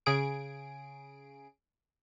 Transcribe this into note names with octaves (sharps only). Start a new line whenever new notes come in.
C#3 G#4 D7